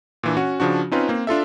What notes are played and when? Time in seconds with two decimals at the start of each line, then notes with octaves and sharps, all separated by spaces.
0.23 A#2 E3 D4
0.37 C#4 F#4 F#5
0.60 C#3 F3 D4 F#4
0.92 C4 C#4 D#4 F4 B4
1.09 A#3 C4
1.27 D4 F4 A4 E5